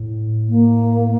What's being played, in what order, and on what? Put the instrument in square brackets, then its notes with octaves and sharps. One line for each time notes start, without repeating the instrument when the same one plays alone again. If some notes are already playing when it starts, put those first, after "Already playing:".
Already playing: [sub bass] A2
[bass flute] A#3